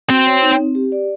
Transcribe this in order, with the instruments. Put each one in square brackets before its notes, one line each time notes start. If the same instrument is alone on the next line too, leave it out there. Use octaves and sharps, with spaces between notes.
[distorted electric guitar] C4 [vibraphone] F#4
[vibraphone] C#5
D#4
C4
G4
D5